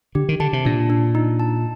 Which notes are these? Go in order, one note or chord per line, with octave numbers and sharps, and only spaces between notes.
D3 G4
D#3
D3 A5
C3
A#2 D4
D4
D#4
A5